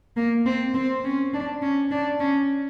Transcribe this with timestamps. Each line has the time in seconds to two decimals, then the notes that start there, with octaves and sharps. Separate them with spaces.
0.16 A#3
0.46 C4
0.74 C4
1.04 C#4
1.34 D4
1.62 C#4
1.91 D4
2.20 C#4